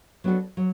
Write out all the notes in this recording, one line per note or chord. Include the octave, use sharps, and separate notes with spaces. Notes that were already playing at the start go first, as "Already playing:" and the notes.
F#3 B3 D4 F#4 A4
F#3